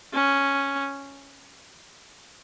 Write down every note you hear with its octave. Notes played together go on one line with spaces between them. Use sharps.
C#4